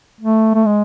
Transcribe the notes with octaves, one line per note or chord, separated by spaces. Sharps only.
A3
A3
G#3